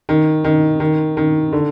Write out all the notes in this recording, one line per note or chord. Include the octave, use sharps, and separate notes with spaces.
D#3
D#3
D#3
D#3
D3